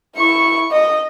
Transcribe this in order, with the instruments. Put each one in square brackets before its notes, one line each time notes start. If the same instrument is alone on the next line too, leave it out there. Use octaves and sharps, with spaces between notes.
[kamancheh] E4 C#6
D#5